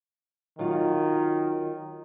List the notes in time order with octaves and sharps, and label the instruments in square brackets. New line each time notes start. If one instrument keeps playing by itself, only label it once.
[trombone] D#3 [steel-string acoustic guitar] F#3 F4